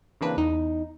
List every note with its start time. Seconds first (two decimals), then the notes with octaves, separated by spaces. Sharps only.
0.21 C#3 E3 A#3 C4 D4 B4
0.37 E2 D#4